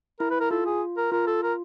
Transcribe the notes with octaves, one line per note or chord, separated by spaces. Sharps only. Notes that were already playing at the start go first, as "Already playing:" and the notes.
E4 A#4
B4
A#4
F4 A4
G#4
A#4
F4 A#4
A4
A#4